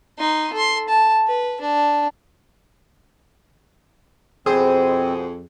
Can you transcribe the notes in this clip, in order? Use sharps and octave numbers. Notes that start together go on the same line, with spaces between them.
D#4 C6
A4 C6
A5
B4
D4
F2 B2 C4 G#4 C5